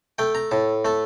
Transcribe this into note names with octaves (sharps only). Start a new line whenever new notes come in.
A3 G5
A#5
A2 A5
A3 A5